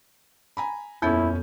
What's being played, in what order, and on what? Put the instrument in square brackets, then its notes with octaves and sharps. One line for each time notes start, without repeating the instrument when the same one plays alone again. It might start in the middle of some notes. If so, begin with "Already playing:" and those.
[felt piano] G#5 A#5 B5
[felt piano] D#1 C#4 G6 [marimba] F2 B3 A4 [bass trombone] E4